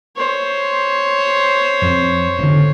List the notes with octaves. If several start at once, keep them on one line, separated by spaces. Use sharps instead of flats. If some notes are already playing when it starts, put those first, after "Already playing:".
C5 C#5
F2
G#1 D3